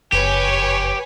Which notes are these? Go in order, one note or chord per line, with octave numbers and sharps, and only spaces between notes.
F#1 F2 G4 B4 C#5 G#5